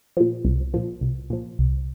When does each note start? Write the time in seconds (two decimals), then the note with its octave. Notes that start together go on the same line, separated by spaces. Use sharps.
0.17 A#2 F3
0.45 C2
0.74 A#2 F3
1.01 C2
1.30 A#2 F3
1.59 C2